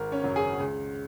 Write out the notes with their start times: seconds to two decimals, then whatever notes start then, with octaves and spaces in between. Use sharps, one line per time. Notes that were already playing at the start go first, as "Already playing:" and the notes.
Already playing: G#1 A#4
0.12 C#4 C#5
0.23 F#2 C#3 F#3
0.36 G#4 G#5
0.60 C#2